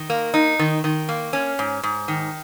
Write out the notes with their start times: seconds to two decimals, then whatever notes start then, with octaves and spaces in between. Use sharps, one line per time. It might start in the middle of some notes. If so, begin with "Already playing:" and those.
Already playing: D#3
0.10 A#3
0.34 D#4
0.59 D#3
0.84 D#3
1.09 A#3
1.33 C#4
1.59 G#2
1.83 G#2
2.08 D#3